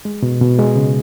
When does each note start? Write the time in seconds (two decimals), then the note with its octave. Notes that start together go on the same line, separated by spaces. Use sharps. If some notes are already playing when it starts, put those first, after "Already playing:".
0.05 G#3
0.23 B2
0.41 B2
0.59 G#3
0.76 C#3